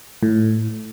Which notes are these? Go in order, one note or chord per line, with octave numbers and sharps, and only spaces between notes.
A2